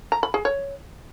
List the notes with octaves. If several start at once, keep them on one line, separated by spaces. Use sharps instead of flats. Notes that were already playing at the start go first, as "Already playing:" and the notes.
A#5
B5
G#4
C#5